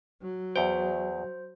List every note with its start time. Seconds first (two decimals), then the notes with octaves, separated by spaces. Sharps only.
0.22 F#3
0.56 E2 C5 G5